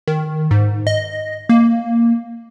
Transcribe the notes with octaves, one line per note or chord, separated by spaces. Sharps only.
D#3
G#2
D#5
A#3